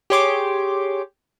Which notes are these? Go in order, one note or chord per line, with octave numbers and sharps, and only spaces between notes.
G4 G#4 C#5 C6 D6